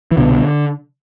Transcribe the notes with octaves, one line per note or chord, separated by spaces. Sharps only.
E3
C2 B2 D3